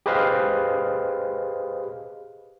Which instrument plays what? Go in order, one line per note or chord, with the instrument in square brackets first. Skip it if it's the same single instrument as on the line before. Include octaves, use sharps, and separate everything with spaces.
[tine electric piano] G4 G#4 B4 C5 D#5 F5